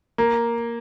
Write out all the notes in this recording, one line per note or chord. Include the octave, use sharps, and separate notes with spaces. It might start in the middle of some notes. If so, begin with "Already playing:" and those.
A#3